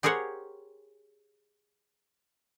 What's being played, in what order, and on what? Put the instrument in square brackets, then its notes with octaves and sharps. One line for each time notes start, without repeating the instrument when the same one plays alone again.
[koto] G4 G#4 A#4 C5 C#5 F#5